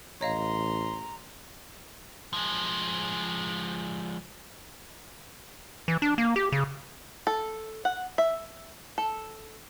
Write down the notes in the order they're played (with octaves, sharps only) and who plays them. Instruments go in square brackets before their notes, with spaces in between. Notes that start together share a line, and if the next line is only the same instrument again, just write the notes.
[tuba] A1 [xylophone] C#5 D#5 F5 [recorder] A#5 [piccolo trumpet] C6
[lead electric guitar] F3 G#3
[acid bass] E3
D4
A#3
G4
C#3
[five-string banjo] A4
F#5
E5
A4